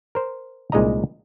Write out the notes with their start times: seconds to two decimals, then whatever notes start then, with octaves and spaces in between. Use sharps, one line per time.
0.15 A#4 C5
0.72 C2 A#2 G#3 D#4 D#5 A#5